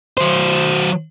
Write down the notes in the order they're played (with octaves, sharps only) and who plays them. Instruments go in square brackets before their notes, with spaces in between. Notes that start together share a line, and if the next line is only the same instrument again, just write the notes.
[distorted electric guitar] F#3 C5